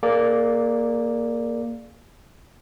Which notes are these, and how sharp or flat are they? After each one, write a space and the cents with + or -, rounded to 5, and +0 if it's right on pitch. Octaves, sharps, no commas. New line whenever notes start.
A#3 +0 G#4 +35 D5 +0